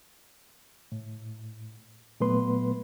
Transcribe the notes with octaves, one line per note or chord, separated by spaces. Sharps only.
A2
A#2 F#3 A3 B3 B4 C6